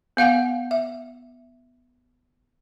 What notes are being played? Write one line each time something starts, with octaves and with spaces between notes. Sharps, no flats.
B3 F5 F#5 G#5
E5